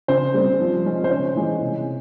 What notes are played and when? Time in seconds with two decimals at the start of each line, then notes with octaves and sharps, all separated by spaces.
0.08 C#3 C5
0.34 G3 C4
0.59 F3
0.85 G#3 C#4
1.04 C5
1.10 C#3 C#5
1.36 E3 G#3
1.61 C3